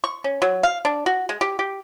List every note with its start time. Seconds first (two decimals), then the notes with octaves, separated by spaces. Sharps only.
0.04 C#6
0.24 C#4
0.42 F#3
0.63 F5
0.85 D4
1.06 F#4
1.29 G#3
1.41 G4
1.59 G4